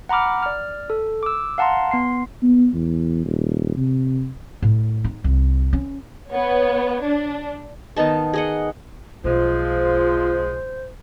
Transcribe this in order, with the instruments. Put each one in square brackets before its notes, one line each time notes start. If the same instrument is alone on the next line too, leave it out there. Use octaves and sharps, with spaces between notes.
[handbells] F#5 A#5 B5 D6 F6
D5 F6
A4
D6 E6
F5 F#5 A5 A#5 C6
B3 C6 C7
[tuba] B3
E2
D#1
C3
[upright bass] A2
D#4
C2
C#4
[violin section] B3 C#5
D4
[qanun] D#3 B3 D#4 A5
G#4 D#5 F#5
[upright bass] B1 [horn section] F3 G#3 [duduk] F4 [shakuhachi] C5